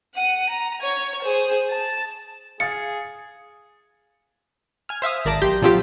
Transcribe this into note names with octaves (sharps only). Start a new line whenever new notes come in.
F#5 D#7
A#5
C#5 G#6
G#4 C5
A5
G#4 F5 A6 C#7
G#5 F6
C5 E5 F5 D#6
G#1 A#4 D5 A5 A#6
B1 G4 C6 G6
A#2 F3 F#3 C4 F4 G4